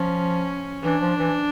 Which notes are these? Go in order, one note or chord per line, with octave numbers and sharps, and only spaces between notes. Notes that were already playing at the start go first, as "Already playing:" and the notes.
Already playing: F3 C#4
E3 D4
F3
E3